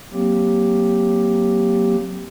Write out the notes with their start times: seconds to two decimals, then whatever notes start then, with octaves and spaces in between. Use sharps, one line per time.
0.13 F#3 A#3 C4 G4